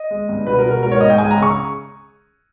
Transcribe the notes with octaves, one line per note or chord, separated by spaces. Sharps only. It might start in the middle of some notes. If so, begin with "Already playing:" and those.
Already playing: D#5
G#3
G2
B2 B4
A#4
B2
A#4
G#2 A#4
C#5
G#2 D#5
G5
G#3 G#5
A#5
C#3
C#6